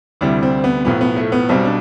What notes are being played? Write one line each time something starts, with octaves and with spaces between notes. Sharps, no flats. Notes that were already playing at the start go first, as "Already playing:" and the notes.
D2 C3 G3 E4
C4
B3
B1 A2 F3 B3
B3
A3
B3
B1 B2 G3 C4
D4